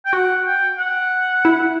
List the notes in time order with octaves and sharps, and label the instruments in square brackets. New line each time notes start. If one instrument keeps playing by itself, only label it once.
[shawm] G5
[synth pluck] F#4 [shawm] F#5
[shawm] G5
F#5
[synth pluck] E4